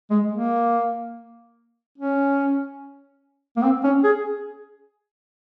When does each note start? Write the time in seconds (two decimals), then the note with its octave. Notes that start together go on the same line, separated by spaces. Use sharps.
0.11 G#3
0.32 A#3
1.98 C#4
3.57 A#3
3.63 C4
3.84 C#4
4.04 G#4